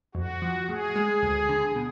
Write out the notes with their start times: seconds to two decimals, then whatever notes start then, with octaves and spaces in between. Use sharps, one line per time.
0.15 F2 F#4
0.42 F3
0.68 A2 G#4
0.96 G#3
1.23 D2
1.49 D3
1.76 B2